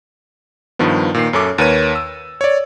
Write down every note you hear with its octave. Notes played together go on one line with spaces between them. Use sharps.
G2 D#3 F3 B3
A#2 D#3 C7
F#2 C#4 A4 D6
D#2 A#4 B4 C#5 D#7
E6
C#5 D5